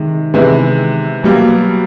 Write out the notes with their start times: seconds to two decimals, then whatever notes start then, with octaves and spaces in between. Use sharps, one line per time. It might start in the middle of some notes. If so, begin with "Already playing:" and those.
Already playing: C3 D#3 G#3
0.34 C3 E3 G#3 B3 E4
1.23 B2 F#3 G3 A#3